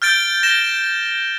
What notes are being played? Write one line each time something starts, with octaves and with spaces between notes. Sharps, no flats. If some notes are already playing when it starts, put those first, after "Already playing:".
F6 G6 A6 D7 G7
A#6 E7 G7